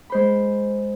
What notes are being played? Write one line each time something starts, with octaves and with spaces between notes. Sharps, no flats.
G#3 C5 B5